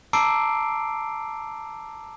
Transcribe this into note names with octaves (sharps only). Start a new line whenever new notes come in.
A5 A#5 D6 E6 C7 D7